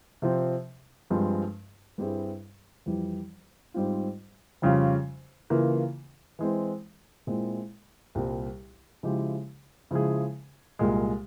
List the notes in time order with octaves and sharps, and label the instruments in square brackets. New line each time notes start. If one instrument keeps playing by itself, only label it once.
[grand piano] C3 F3 C4
G2 F3 G#3 C4
G2 G3 C4 E4 G#4
F2 E3 G3
G#2 G3 C4 F4
F2 C#3 G3 C#4 F4
C#3 E3 A#3 F4
E3 G#3 C4
A#2 G#3 C4 E4
C2 A#2 G3 C4
C#3 F3 G#3 E4 G4
C#3 F3 G#3 E4 G#4
C2 A#2 G#3